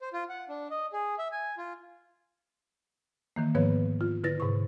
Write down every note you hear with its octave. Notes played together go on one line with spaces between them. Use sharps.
C5
F4
F#5
D4
D#5
G#4
E5
G#5
F4
D#3 E3 A#3
G#2 D#3 F3 B3 B4 C#5
F4
D3 E4 B4 A6 A#6
G#2 C3 C#6